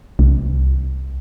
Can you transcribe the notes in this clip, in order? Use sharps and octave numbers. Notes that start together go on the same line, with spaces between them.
C2